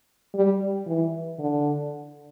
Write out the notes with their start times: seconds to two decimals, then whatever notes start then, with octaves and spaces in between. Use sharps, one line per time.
0.35 G3
0.87 E3
1.39 D3